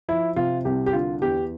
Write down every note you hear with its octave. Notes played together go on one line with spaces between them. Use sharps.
F3 E4
C3 F4
C2 G4
G4
D3 F4
E2 G4